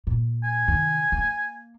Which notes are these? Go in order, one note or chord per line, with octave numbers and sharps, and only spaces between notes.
A#2
G#5
C3 D#3
A#3